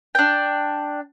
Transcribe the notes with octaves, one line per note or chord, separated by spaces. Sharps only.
D4 G5